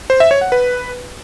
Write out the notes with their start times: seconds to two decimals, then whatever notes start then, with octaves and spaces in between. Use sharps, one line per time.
0.10 C5
0.20 E5
0.31 C#5
0.41 F#5
0.52 B4